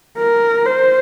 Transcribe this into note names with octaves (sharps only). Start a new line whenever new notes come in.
A#4
C5